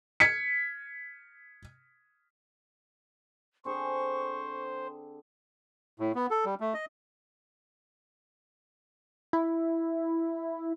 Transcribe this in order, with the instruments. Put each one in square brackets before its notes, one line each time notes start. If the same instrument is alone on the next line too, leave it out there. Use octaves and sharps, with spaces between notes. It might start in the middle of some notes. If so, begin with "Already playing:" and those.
[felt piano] G#6 B6 C#7
[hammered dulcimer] D3 C4 G#4 [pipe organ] C5 [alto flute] C#6
[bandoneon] A2
B3
A4
G3
A3
D#5
[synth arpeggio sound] E4